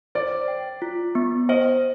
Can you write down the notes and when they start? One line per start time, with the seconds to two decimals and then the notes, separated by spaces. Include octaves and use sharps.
0.15 C5 D5
0.48 G5
0.82 F4
1.15 B3
1.49 C5 D#5